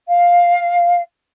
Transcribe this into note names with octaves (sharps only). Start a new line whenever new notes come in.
F5